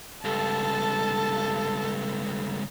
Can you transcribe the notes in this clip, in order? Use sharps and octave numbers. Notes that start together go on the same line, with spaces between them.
C#2 G2 A4 A5